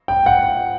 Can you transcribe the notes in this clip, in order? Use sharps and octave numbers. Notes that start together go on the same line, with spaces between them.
G5
F#5